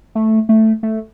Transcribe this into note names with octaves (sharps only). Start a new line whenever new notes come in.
A3
A3
A3